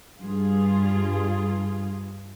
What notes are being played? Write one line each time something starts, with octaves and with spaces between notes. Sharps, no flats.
G2 F4 G#4